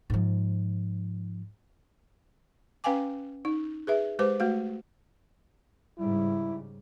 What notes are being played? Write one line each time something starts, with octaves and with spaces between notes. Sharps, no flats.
G#2 F3
C#4 B4 F5 G5 G#5 D6
D#4
G#4 B4 E5
G#3 G4 B4 C5 D6
A3 F#4 F5
G#2 C#3 G3 E4